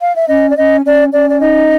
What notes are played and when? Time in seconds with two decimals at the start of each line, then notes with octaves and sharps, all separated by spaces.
0.01 F5
0.15 E5
0.28 C#4 D#5
0.50 D5
0.56 C#4 D#5
0.85 C#4 D5
1.12 C#4 D5
1.29 D5
1.39 D#4 D#5